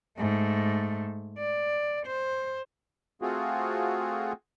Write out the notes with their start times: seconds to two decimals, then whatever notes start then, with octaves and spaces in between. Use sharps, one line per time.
0.18 G#2 A3
1.39 D5
2.07 C5
3.22 A3 C4 F4 F#4 G#4